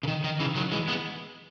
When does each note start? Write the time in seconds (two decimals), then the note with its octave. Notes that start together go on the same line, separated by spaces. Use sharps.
0.03 C#3
0.08 D#3
0.24 D#3
0.40 C#3 E3
0.55 D#3 F#3
0.72 E3 G#3
0.88 G#3 B3